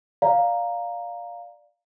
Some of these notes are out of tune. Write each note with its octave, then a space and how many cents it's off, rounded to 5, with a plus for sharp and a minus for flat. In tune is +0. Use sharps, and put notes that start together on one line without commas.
D5 +0 F5 +0 A#5 +0